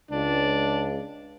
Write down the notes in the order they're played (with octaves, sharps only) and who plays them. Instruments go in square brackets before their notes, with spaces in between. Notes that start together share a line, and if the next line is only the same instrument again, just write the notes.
[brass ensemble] C#2 [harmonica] D4